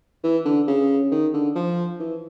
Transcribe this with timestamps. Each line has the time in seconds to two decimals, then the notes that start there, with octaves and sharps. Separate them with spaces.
0.23 E3
0.45 D3
0.67 C#3
1.11 D#3
1.33 D3
1.55 F3
1.99 E3